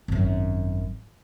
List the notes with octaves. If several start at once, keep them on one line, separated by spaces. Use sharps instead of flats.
G#1 F#2